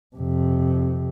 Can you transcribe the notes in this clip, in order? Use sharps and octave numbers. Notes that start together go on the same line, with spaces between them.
F2 C3